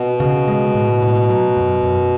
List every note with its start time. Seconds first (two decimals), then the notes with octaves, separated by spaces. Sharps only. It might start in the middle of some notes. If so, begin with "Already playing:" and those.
Already playing: B2
0.20 C#3
0.48 G#3
0.75 A2
1.02 A2
1.29 F#3
1.57 F#2
1.83 F#2